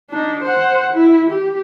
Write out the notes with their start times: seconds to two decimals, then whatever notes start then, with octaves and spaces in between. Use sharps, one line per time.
0.10 D4 D#4
0.43 C5 F#5
0.93 E4
1.30 G4